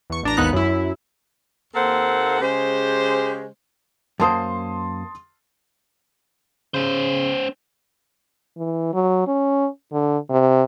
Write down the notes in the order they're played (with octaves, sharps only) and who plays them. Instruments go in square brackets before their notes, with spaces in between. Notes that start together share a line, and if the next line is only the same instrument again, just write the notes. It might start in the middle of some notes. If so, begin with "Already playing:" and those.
[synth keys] E2 C#6
A1 D4 A#5
G#1 D#2 B3 D#4 F#6
F#2 E4
[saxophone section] D#2 A#3 C4 A4 C5 F#5
C#3 G#3 G4 C5
[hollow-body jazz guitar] F#2 A#3 C5 [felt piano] A5 C6 D#6
[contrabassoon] C#3 [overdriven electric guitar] C#4 C5
[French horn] E3
F#3
C#4
D3
C3